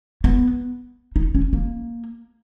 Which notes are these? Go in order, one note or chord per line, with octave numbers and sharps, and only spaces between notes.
B3
D#4
C#4
A#3